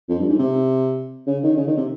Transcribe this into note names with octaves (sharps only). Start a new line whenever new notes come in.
F2
G2
G#2
C3
C#3
D#3
C#3
D#3
C3